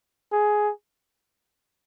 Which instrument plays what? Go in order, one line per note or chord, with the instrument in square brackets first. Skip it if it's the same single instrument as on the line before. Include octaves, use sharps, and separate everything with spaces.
[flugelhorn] G#4